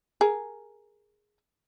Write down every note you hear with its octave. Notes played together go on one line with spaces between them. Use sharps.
G#4 A#4